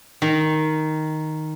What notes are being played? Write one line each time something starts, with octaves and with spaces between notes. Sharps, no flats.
D#3